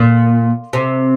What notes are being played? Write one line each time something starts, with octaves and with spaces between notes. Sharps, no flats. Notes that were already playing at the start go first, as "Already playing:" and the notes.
Already playing: A#2
C3